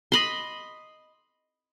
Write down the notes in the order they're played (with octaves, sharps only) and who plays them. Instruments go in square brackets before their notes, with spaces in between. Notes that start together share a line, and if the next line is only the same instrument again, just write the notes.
[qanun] D#5 B5 C6